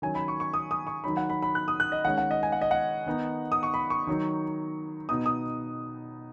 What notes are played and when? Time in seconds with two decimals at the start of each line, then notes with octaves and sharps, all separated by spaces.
0.02 D#3 F#3 C#4 G#5
0.15 B5
0.28 C#6
0.40 C#6
0.54 D#6
0.71 D#6
0.87 C#6
1.04 D#3 F#3 D#4 B5
1.17 F#5
1.30 B5
1.43 B5
1.55 F#6
1.68 D#6
1.80 F#6
1.92 D#5
2.05 D#3 G#3 C#4 F#5
2.18 F#5
2.31 D#5
2.43 G#5
2.52 F#5
2.61 D#5
2.71 F#5
3.06 D#3 B3 D#4
3.52 D#6
3.63 C#6
3.74 B5
3.90 C#6
4.07 D#3 F#3 D#4
5.09 B2 B3 D#4 D#6
5.26 D#6